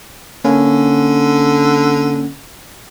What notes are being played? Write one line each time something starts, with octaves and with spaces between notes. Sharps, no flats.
D3 A#3 C#4